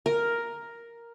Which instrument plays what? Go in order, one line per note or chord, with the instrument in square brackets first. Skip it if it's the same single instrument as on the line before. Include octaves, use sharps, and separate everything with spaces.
[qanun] A#4